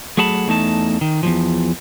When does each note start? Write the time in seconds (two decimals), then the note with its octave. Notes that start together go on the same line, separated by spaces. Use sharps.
0.17 F#3 A3 G#4 F#5 A5 B5
0.48 E2 A3 D#4 A5
1.01 D#3
1.23 E2 G#2 F3